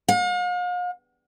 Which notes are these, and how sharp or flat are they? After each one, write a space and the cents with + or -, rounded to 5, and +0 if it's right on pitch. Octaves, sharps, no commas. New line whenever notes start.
F5 +45